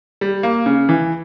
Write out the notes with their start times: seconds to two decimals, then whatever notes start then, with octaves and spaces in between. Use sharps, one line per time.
0.21 G3
0.43 A#3
0.66 C#3
0.89 E3